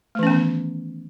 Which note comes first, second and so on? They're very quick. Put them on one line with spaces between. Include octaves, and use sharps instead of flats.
A3 E3 C#4 B3 D#3